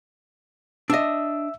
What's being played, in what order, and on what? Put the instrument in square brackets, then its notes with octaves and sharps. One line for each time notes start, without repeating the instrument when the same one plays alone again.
[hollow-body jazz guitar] D4 D#5 [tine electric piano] E5 E6